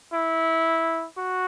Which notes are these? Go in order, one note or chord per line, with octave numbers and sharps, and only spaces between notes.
E4
F#4